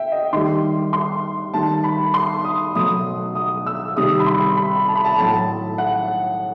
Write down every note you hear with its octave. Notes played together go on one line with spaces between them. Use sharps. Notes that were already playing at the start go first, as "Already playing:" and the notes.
Already playing: E5 G5
D#5
D#3 G3 C6
C6
D#3 G3 A5
B5
C6
D#6
B2 F#3 A3 D#6
D#6
E6
C3 D#3 G3 D#6
B5
C6
B5
A5
B5
A5
A2 F#3 A3 A5
F#5